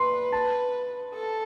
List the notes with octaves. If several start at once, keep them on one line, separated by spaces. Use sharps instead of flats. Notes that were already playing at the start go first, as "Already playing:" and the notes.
Already playing: B4 C6
A5
A4